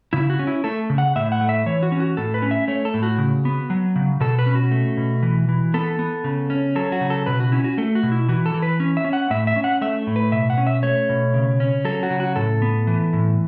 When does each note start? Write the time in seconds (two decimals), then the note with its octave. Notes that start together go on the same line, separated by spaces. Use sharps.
0.13 C#3 E4
0.30 F#4
0.39 C#4
0.47 E4
0.64 A3 A4
0.90 C#3
0.98 F#5
1.16 A2 E5
1.32 F#5
1.41 A3
1.49 E5
1.66 E3 C#5
1.83 F#4
1.92 C#4
2.00 F#4
2.17 A2 A4
2.34 B4
2.42 C#4
2.51 E5
2.68 A3 C#5
2.85 A4
2.94 A2
3.03 F#4
3.18 C#3
3.45 B3
3.70 F#3
3.96 C#3
4.20 B2 A4
4.39 B4
4.46 C#4
4.55 F#4
4.71 A3
4.97 B2
5.23 E3
5.49 E3
5.74 B3 A4
5.99 B3
6.24 C#3
6.50 C#4
6.75 F#3 A4
6.92 F#4
7.01 C#3
7.10 A4
7.26 B2 B4
7.40 F#4
7.52 C#4 E4
7.64 F#4
7.78 A3 A4
7.95 F#4
8.03 B2
8.12 E4
8.29 E3 F#4
8.46 A4
8.54 E3
8.62 B4
8.80 C#4
8.97 E5
9.05 C#4
9.13 F#5
9.30 A2 E5
9.47 E5
9.56 C#4
9.64 F#5
9.81 A3 E5
10.07 A2
10.16 B4
10.32 B2 E5
10.50 F#5
10.58 C#4
10.67 E5
10.83 A3 C#5
11.09 B2
11.34 C#3
11.60 C#4
11.85 F#3 A4
12.03 F#4
12.10 C#3
12.20 F#4
12.36 A2 A4
12.62 B3
12.87 E3
13.13 A2